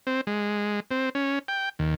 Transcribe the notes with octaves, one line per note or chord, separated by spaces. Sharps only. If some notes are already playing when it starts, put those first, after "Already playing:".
C4
G#3
C4
C#4
G5
D#2